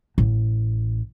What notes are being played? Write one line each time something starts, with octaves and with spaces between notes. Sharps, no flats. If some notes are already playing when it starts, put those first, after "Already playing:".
A1